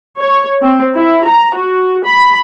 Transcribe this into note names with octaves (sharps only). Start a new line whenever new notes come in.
C#5
C4
E4
A#5
F#4
B5